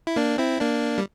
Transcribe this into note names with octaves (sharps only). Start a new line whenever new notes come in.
E4
A#3 D4
C4 E4
A#3 D4
G3